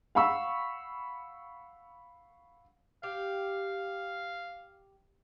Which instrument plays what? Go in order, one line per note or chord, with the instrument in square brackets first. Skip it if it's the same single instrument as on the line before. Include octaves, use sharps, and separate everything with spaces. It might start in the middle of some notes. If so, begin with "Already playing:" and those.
[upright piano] F5 F#5 B5 C#6 E6
[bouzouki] G4 [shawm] F5